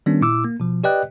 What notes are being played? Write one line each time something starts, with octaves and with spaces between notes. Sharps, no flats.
D#3 G3 B3 C#4 D4
A#2 E4 D6 E6
A#3
B2 F3
G4 B4 D5 D#5 G5 F#6